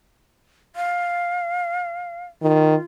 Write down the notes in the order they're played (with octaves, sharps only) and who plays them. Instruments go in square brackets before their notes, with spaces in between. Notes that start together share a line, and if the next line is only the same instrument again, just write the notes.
[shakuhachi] F5
[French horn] D#3 [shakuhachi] F4